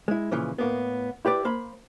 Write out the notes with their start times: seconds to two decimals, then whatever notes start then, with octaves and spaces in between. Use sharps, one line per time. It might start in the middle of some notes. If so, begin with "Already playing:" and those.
0.08 G#3 E4
0.31 A#2 C#3 E3 F3
0.58 A2 A#3 B3
1.25 E4 G4 B4 D5
1.45 A#3 C5 B5